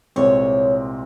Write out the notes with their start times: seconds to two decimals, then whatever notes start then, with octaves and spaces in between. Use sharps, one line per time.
0.16 C2 A#2 G#3 C4 C#5